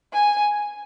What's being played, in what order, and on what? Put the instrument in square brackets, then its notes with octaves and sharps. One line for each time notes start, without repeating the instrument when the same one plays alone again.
[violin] G#5